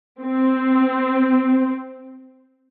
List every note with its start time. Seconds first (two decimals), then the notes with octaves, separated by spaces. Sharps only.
0.21 C4